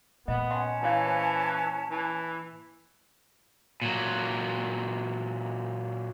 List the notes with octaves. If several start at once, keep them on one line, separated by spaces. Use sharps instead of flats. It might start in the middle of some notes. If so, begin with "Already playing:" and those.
A#2 B3 D#5
C#4 D#5 F#5 A5 A#5 C6
E3 E4 C#5 F5
C5
E3
A#2 F#3